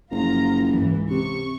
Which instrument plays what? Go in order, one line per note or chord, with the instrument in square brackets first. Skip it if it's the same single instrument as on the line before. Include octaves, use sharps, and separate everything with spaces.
[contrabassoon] F#1 [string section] F3 F4 A#5
[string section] C#2 G#2 E3
[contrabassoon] C3 [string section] C#6